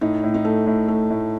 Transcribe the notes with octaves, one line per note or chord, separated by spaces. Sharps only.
A2 D#4
A2
D#4
A3
A2
A3
A2